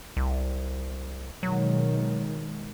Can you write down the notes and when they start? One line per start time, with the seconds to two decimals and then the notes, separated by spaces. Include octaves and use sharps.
0.17 C2
1.43 B2 D#3 F#3 G#3